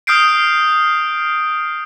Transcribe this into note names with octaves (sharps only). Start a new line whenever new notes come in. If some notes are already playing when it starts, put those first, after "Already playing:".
D#6 F6 G6 C7 D7